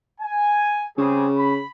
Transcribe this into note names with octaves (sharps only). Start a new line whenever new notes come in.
G#5
C#3 G3 C4 G#4
B5